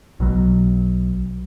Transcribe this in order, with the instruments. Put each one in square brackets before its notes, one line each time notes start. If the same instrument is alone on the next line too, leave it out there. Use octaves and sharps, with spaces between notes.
[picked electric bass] B1 B2 F#3